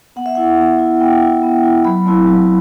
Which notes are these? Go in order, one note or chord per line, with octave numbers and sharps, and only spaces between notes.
B3 F#5
E5
E4 F#5
B3
E4
B3 G5
E4
B3
E4
F#3 B5
A3 C4 E4
F#3